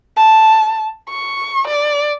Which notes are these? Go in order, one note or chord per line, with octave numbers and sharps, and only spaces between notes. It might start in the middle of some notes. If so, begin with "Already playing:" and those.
A5
C#6
D5